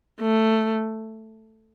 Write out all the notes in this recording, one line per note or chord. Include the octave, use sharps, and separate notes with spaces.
A3